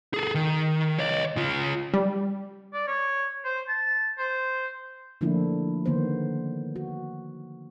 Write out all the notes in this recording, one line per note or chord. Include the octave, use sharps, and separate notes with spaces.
G#4 A4
D#3
C#5 D#5
C#3 F4
G3
D5
C#5
C5
A5
C5
D3 F3 A3 A#3 D4 E4
D3 D#3 A#3 B3 C5
F#4